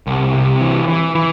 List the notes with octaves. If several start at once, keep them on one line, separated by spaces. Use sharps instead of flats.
C2
C3
E3
E3
E3